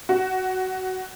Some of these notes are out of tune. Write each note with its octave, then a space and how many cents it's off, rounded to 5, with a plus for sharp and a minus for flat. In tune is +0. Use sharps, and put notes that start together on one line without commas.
F#4 +20